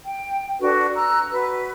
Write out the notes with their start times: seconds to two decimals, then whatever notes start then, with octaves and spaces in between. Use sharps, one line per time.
0.05 G5
0.60 D4 F#4 A4 B4
0.95 A#5 E6 F#6
1.31 F#4 B4